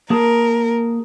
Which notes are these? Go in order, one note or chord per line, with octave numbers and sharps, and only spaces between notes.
A#3 G#4 A#4 A5